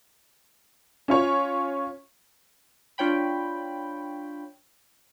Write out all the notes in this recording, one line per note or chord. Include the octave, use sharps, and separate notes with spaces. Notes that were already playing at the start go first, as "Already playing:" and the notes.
C#4 F4 C#5
D4 F4 C#5 G5 B5